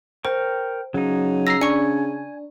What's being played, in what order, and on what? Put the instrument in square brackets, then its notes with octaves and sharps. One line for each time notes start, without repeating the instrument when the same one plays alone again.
[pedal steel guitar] A#4 G5 C#6 [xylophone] C5
[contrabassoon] C#3 [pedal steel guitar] F#3 D#4
[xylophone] A#5 E6 [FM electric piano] A#6 C7
[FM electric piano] D4 [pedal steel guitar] G#5 [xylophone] C#6 C#7